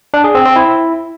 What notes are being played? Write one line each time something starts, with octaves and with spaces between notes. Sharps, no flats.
D4
G#4
C4
C4
E4